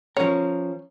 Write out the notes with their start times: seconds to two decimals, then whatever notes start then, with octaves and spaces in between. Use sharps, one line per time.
0.17 F3 C#4 A#4 C#5